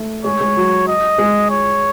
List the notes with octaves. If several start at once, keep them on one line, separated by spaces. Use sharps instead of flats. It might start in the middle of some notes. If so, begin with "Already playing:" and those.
Already playing: A3
G#3 C#5
G#3
F#3
D#5
G#3
C#5